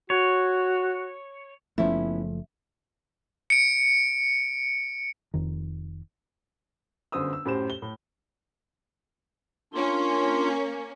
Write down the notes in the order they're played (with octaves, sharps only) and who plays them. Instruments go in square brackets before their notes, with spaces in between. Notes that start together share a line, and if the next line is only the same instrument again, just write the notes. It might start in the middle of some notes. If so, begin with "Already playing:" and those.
[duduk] F#4 [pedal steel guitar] C#5
[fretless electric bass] F#1 F3 A3 [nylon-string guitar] B3 C#4 E4 [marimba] E5
[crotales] C#7 D7
[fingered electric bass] F1 F2 D#3
[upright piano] G1 F#2 C5 D#6 E6
E6
F#2 A2 G4 C5 E7
G7
A2
[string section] A#3 C#4 [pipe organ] D4 F4 C6